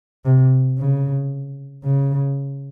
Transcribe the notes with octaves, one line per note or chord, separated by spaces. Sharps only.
C3
C#3
C#3